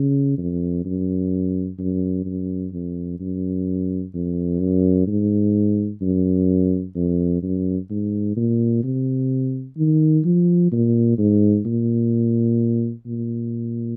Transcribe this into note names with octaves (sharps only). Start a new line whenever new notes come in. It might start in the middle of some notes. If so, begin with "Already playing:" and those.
Already playing: C#3
F2
F#2
F#2
F#2
F2
F#2
F2
F#2
G#2
F#2
F2
F#2
G#2
A#2
C3
D#3
F3
A#2
G#2
A#2
A#2